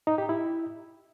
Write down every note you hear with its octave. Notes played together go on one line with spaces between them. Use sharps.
D#4
G4
E4